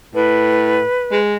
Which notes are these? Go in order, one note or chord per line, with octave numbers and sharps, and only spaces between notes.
A2 B4
G#3